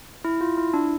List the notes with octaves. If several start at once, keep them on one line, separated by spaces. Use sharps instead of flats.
E4
F4
E4
D4